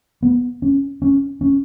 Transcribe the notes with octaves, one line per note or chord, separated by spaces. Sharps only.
B3
C#4
C#4
C#4